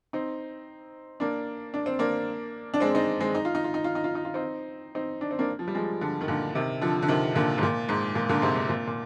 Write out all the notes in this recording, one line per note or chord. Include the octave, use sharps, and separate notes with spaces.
C4 D#4
A#3 D4
D4
C4
A#3 D4
D4
G#3 C4
C4 D#4
G#3 C4
D#4
F4
D#4
F4
D#4
F4
D#4
F4
D#4
F4
C4 D#4
C4 D#4
D4
C4
A#3 D4
F3
G3
F3 G#3
D3 F3
D#3
A#2 D3
C3 D#3
D3 F3
D3
C3 D#3
A#2 D3
G#2
A#2
G#2
A#2
A#2 D3
G#2 C3
G#2
A#2
A#2